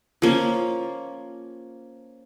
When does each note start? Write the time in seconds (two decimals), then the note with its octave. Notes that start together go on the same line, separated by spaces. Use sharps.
0.22 F3 A#3 C#4